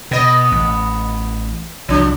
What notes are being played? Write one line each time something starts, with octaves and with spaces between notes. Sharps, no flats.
B2 B3 D#5
A1
C2 C3 E3 F3 D4